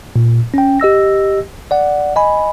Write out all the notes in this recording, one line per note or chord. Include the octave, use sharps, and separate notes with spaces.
A#2
C#4 G5
G4 D#5 E6 A#6
D5 F#5
D#5 G#5 B5